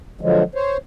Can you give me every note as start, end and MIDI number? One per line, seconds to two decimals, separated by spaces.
0.21 0.43 50
0.21 0.43 53
0.21 0.43 54
0.21 0.43 56
0.55 0.77 72
0.55 0.77 73